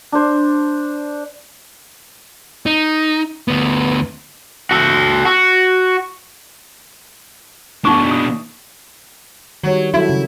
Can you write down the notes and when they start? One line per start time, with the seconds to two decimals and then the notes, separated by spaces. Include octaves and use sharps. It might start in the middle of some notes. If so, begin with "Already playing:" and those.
0.12 D4 C5
2.66 D#4
3.48 D2 B3
4.71 F#4 A4
5.26 F#4
7.85 B2 D4 D#4 C#6 D6
8.11 D#6
9.63 D#3 F#3 G3 C#5
9.94 F#3 E4 F#4 A4
10.09 C#3